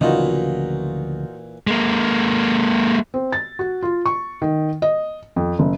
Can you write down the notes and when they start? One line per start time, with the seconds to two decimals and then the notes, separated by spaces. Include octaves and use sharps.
0.01 D2 A#2 C#3 E3 F3 D#4 F4 F#4
1.67 G#3 A#3
3.14 C4
3.32 A6
3.59 F#4
3.83 F4
4.06 C#6
4.42 D#3
4.82 D#5
5.36 F2
5.59 F#1